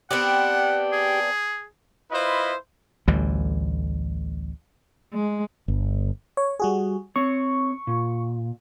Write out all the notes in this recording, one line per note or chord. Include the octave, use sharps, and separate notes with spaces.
B3 C4 D4 G4 F#5 G5
G#4
E4 F4 B4 C5 D#5
A1 D2 E3 G3
G#3
G1
C#5
G3 F#4 G#4
C4 C#5 C#6
A#2